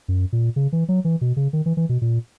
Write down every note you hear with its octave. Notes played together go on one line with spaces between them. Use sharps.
F#2
A#2
C#3
E3
F#3
E3
B2
C#3
D#3
E3
E3
B2
A#2